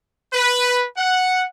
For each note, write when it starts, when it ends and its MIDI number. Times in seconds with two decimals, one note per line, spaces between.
0.33 0.84 71
0.97 1.44 78